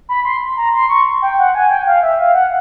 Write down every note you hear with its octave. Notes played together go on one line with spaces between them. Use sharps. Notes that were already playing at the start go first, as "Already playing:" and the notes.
B5
C6
A#5
C6
C#6
G5
F#5
G#5
G5
F5
E5
F5
F#5